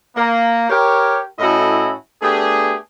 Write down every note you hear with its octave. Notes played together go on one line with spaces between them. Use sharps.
A#3
G4 A#4 C#5
A2 C#4 E4 F#4 A4 D#5
A3 B3 D4 G4 G#4